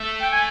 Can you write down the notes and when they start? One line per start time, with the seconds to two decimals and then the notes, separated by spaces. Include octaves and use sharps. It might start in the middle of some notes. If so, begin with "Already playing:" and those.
Already playing: A3
0.20 G5
0.32 G#5